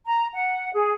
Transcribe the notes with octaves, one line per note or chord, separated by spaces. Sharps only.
A#5
F#5
G#4